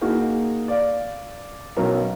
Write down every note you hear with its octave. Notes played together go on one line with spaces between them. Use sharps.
A#3 D#4 F#4 G#4
D5 F5
B1 B2 C#4 A#4 A#5